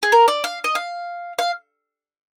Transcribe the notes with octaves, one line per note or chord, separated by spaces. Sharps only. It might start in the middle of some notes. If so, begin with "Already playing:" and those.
G#4
A#4
D5
F5
D#5
F5
F5